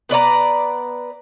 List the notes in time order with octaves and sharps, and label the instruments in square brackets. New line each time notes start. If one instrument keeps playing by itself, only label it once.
[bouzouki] B3 B4 D5 A#5